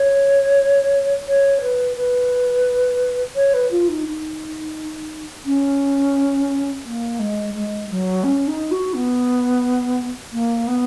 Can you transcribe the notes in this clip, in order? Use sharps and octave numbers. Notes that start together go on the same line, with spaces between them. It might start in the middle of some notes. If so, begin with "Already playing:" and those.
Already playing: C#5
C#5
B4
B4
C#5
B4
F4
D#4
D#4
C#4
A#3
G#3
G#3
F#3
C#4
D#4
F#4
B3
A#3
B3